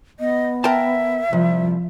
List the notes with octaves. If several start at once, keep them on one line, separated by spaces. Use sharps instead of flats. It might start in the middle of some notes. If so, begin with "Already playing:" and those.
B3 D#5
A#4 E5 G5 A5
C2 F3